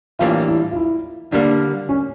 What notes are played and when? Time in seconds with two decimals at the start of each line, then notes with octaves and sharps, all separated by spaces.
0.19 A2 E3 G3 A#3 D4 F4
0.48 E4
0.71 F4
0.76 E4
1.32 D3 G3 A#3 D4
1.89 C#4